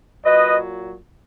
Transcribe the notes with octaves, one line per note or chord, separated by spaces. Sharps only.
A#2 F#3 B4 D#5